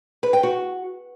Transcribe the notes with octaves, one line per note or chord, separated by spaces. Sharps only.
B4
G5
F#4